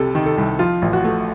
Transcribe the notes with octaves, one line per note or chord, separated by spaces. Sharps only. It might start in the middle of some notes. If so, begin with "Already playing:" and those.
Already playing: C2 C3 G3 A4
D#3
A4
C2
F3 F4
A1
F#4
A3